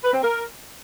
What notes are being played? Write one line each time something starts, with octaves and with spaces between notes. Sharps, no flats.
B4
C4
A#4